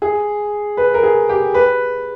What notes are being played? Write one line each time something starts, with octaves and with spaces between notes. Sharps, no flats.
G#4
B4
A#4
G#4
G4
B4